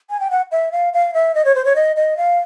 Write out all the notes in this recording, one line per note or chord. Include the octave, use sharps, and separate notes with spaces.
G#5
G5
F#5
E5
F5
F5
E5
D#5
C#5
C5
C#5
D#5
D#5
F5